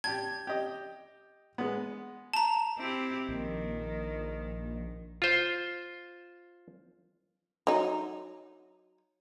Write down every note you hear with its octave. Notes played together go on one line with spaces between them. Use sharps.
G4 A5 G#6
G4 D#5
G#3 B3
A5 A#5
C4 E4 G4
A#1 D#3
F4 C5
F#3 D#4